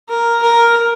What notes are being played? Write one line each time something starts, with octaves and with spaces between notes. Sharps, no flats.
A#4
A#4